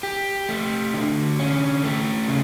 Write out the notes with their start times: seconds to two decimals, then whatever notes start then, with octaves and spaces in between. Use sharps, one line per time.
0.03 G4
0.49 A3
0.94 D3
1.39 C#4
1.83 A3
2.28 C#3